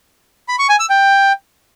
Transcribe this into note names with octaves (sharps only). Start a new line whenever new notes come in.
B5
C#6
G#5
E6
G5